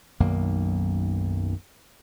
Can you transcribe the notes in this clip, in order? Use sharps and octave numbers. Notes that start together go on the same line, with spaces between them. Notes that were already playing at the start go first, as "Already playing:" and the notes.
B1 F#2 D#3 A#3